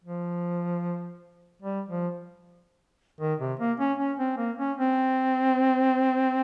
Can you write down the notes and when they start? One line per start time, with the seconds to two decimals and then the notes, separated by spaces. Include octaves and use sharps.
0.04 F3
1.62 G3
1.89 F3
3.21 D#3
3.40 C3
3.59 A#3
3.79 C#4
3.99 C#4
4.19 C4
4.38 A#3
4.58 C#4
4.77 C4